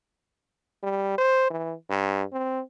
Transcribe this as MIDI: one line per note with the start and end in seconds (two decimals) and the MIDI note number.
0.83 1.15 55
1.18 1.50 72
1.50 1.74 52
1.90 2.23 43
2.33 2.61 60